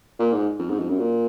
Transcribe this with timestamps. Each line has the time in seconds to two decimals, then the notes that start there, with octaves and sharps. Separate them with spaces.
0.19 A#2
0.33 G#2
0.59 F2
0.69 G#2
0.80 F2
0.90 F#2
0.99 A#2